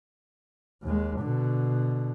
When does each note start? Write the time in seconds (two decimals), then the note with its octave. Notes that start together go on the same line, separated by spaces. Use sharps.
0.83 D#2 G#3
1.20 B2 D3